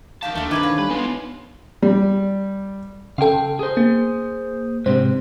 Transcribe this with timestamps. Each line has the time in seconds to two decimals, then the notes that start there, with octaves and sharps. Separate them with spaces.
0.23 F2 D#3 F#4 G4 F5 A5
0.35 D#2 A3 D4 A#4 C5
0.51 G2 C3 D#3 A3 D#4 B4 D6 G#6
0.63 C#4 F5
0.79 G3 B4
0.90 G#3 B3 D#4 F4 G#5
1.82 G3
3.18 C#3 A4 F5 G5
3.59 G#4 C5
3.77 A#3
4.86 G#2 C3 C5